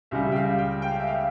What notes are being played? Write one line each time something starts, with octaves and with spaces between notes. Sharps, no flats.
C#2 C#3 G3 E5
G5
F5
G5
G5
F5
E5
F5